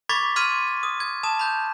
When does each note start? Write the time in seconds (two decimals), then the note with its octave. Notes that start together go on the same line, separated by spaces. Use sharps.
0.09 B5 C#6 D6 G#6 A6 B6
0.36 B5 C6 F6 G#6 D#7
0.83 D#6
1.00 G#6
1.23 A5 D#6 E7
1.39 B5 G6